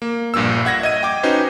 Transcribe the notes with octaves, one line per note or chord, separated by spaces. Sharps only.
A#3
A#1 G2 A#2 A#3 E6
E5 F#5 G#6 A#6
D#5 G#6 D#7
G5 D6
C#4 D#4 F#4 B4 C5